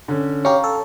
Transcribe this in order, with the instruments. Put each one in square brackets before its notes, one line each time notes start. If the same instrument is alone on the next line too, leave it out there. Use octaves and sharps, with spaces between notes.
[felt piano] D3 C#4
[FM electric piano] C#4 G4 [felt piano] F5 A#5 C#6
[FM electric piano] A4